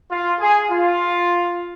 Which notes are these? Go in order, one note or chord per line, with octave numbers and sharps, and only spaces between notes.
F4
G#4
F4